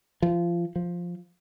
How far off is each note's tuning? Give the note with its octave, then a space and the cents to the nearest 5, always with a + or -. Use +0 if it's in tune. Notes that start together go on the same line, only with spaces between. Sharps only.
F3 -25
F3 +5